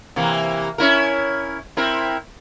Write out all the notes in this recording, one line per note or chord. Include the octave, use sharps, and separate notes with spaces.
C3 E3 A#3
C#4 E4 A#4
C4 E4 A#4